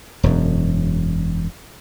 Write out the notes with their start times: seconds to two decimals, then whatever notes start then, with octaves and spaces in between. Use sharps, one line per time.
0.23 E1 F#2